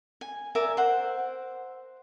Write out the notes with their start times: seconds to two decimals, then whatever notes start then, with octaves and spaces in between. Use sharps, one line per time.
0.21 G#5
0.55 A#4 D5 E5 G#5
0.77 C5 F#5